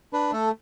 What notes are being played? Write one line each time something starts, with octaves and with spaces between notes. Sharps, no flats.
D4 B4
A3 A4